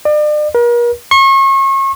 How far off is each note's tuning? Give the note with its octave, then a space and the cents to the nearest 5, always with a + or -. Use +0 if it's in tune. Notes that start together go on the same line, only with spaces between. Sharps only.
D5 +40
A#4 +40
C#6 -35